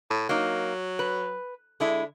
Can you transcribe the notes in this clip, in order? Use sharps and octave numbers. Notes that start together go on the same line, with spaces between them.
A2
F#3 A#3 D#4
B4
D3 G#3 E4